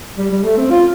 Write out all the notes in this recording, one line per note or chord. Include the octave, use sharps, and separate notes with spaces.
G3
G3
A3
C4
F4